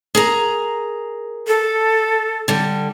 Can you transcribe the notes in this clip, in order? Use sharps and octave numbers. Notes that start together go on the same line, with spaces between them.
G#4 A#4 A#5
A4
D3 G3